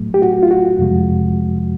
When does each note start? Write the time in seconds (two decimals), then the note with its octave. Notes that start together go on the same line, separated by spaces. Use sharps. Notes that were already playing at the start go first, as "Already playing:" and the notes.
Already playing: A2 F#3 A3
0.14 G4
0.22 F#4
0.43 F4
0.51 F#4
0.79 F2 C3 F3 G#3